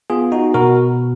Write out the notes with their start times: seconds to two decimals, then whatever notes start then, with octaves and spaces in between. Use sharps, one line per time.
0.10 B3 F4 G#4
0.32 D#4 F#4
0.54 B2 F#4 A#4